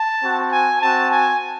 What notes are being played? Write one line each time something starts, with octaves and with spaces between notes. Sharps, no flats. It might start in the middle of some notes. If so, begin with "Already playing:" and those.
Already playing: A5
C4 F#4
G#5
C4 F#4 A5
G#5